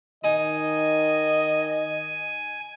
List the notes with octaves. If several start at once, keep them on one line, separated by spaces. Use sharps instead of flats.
D#3 D#4 D#5 G#5